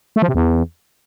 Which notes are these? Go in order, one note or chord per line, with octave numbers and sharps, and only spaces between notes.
A3
F3
C3
E2